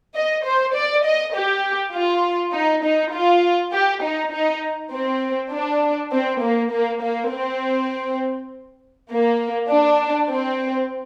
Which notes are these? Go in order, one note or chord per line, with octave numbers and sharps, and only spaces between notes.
D#5
C5
D5
D#5
G4
F4
D#4
D#4
F4
G4
D#4
D#4
C4
D4
C4
A#3
A#3
A#3
C4
A#3
D4
C4